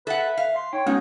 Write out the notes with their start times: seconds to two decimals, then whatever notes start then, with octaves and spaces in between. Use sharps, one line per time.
0.07 A4 B4 E5 F#5
0.37 F5
0.56 C6 C7
0.73 D#4 C#5 G5
0.87 G#3 B3 C#4 D#4 F#4